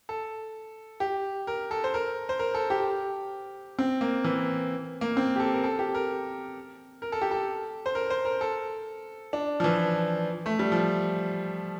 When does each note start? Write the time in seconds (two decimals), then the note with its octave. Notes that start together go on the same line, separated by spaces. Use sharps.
0.09 A4
1.00 G4
1.47 A#4
1.71 A4
1.84 C5
1.94 A#4
2.29 C5
2.39 A#4
2.54 A4
2.70 G4
3.79 C4
4.01 A#3
4.24 E3
5.01 A#3
5.17 C4
5.36 G4
5.40 A4
5.54 A#4
5.64 A4
5.79 G4
5.95 A#4
7.02 A#4
7.12 A4
7.22 G4
7.31 A4
7.86 C5
7.95 A#4
8.10 C5
8.25 A#4
8.41 A4
9.33 D4
9.60 F3
9.64 E3
10.46 A3
10.59 G3
10.72 F3